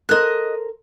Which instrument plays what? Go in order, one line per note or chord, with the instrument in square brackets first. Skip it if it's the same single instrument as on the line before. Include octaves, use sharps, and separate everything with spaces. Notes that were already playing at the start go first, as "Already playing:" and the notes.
[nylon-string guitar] A4 A#4 C5 [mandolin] D#5 F#6